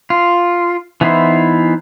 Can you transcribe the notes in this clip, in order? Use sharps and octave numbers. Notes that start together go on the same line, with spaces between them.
F4
E3 B3 D#4 E4 C5